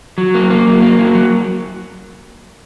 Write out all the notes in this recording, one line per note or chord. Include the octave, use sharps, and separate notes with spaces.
F#3
A#3
A#3
F#3
A#3
F#3
F#3